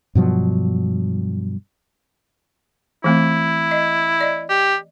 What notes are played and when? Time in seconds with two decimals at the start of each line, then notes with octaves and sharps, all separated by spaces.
0.15 G2 B2 F3 F#3
3.04 E3 A3 C4 E4
3.71 D#5
4.21 D5 D#5
4.49 G4